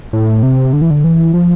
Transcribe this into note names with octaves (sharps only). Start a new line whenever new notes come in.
A2
C3
D3
E3
D3
E3
F3